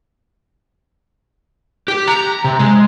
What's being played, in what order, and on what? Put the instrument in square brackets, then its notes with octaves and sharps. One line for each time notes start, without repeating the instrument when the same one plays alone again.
[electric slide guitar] G4
A#5
C3
G#3